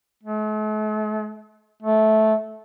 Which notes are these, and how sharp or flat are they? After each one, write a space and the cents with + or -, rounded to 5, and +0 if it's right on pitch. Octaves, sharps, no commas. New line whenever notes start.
A3 -45
A3 -15